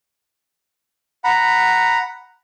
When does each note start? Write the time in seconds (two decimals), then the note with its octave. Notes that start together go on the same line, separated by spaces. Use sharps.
1.24 F#5 A#5 B5